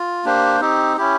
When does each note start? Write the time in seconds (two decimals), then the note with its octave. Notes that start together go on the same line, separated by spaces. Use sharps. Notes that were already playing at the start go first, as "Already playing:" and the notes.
Already playing: F4
0.25 A#3 D4 G4 C5
0.61 C4 D#4 G4
0.97 C#4 E4 G4